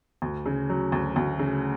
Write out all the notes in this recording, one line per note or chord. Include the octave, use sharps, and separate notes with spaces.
D2
C#3
F#3
D2
D2
C#3